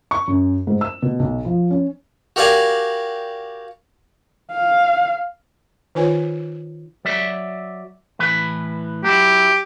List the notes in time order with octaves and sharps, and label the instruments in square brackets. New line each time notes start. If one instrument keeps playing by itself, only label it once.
[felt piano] C#6
F#2
G#2
E6
B2
B1
F3
C#4
[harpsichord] F#4 G4 A#4 D5 F5 G#5
[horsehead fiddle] F5
[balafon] D#3 D#4 F4 B4 C#5 G#5
[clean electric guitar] F#3 D5 E5
A2 E3 B4
[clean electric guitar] F#3 E4 [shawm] G4